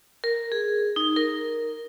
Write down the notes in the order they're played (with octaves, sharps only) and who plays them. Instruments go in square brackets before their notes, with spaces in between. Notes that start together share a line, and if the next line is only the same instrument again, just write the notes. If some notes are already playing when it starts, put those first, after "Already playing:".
[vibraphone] A#4
G#4
D#4
A#4